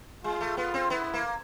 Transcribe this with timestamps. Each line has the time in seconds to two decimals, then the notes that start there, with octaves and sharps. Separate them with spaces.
0.24 G#3 F4
0.40 A3
0.57 B3 F4
0.74 C4
0.90 B3 E4
1.14 A#3